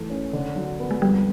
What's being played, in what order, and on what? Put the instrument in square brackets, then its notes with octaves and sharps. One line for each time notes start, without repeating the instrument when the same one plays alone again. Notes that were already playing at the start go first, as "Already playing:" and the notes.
Already playing: [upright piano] E3 A3
C#4
D3
F#3
B3
[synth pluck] G#3
[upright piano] F2 [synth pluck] G3